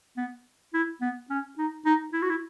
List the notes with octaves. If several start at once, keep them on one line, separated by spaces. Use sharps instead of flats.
B3
E4
B3
C#4
D#4
D#4
E4
F#4
E4